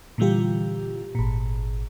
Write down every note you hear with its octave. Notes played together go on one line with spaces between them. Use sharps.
A#2 D3 E3 G3 F4 G4
G#1 A#2